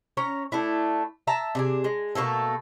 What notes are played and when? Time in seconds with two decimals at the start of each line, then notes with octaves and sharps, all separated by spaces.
0.17 C#4 C#5 A#5
0.52 A3 D4 E4
1.27 E5 A5 A#5
1.55 C3 D4 G#4
1.84 G#3
2.15 B2 A3 A#3 A4